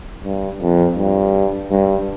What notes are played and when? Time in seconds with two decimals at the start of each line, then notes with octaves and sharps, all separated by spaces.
0.24 G2
0.61 F2
0.98 G2
1.71 G2